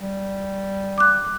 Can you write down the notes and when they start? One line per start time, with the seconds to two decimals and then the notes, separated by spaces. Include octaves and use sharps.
0.02 G3
0.98 D6 F#6